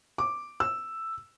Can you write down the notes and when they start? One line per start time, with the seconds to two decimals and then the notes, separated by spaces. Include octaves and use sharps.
0.18 D6
0.60 E6